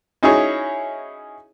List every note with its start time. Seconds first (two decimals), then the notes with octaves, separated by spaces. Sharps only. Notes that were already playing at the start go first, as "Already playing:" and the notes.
0.23 C#4 D#4 E4 F#4 G#4 C#5